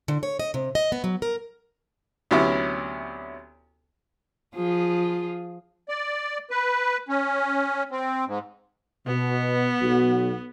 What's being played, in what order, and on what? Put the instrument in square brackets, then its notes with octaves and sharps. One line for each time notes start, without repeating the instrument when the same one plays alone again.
[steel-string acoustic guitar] D3
C#5
D#5
C3
D#5
B3
F#3
A#4
[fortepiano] D2 C3 F#3 B3 C#4 E4
[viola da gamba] F3 F4 G#4
[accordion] D5
B4
C#4
C4
G#2
[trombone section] B2 [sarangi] B3
[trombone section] B1 F#4